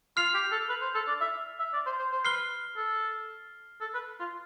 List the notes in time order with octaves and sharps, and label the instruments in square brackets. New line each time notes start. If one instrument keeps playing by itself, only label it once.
[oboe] F4 [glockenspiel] F6 C7 F7
[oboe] G4
A4
B4
C5
A4
D5
E5
E5
D5
C5
C5
C5
[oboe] B4 [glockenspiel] F6 C7 G7
[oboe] A4
A4
B4
F4